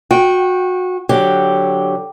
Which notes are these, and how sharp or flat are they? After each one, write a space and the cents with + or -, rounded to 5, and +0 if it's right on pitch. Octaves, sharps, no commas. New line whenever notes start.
F#4 -25 G5 -10
D3 +0 F#3 -10 G4 +0